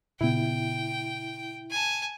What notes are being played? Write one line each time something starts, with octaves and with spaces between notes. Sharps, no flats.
A#2 C#3 B3 E4 G5
G#5 A5